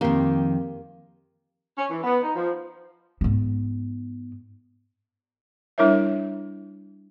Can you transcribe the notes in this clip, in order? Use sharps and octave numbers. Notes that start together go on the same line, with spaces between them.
F2 D#3 A#3 G4 C6
C#4
E3
B3
D#4
F3
G#2 B3
G3 D4 E4 A#4 C#5 E5